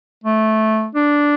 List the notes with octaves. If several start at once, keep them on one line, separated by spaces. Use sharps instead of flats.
A3
D4